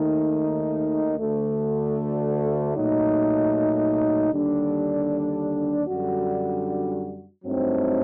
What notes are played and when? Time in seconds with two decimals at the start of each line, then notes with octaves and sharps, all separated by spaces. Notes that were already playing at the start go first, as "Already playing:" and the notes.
Already playing: D#2 D#3 A3 D#4
1.19 D2 D3 A3
2.76 A#2 F#3 A3 D#4
4.31 D#2 D3 G3 D4
5.87 F#2 D3 G3 D4 F#4
7.44 G2 F#3 A3 C4 D#4